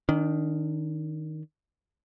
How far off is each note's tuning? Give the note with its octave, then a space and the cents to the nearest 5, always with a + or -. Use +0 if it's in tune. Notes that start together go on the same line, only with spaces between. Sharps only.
D#3 +0 D4 -30